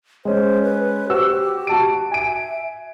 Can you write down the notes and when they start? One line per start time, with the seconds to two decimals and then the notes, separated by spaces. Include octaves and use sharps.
0.25 G#3 C#4 C5
0.62 B4
1.10 F#4 G4 C5 E6
1.67 F#4 A5 D7
2.11 E5 G#5 D7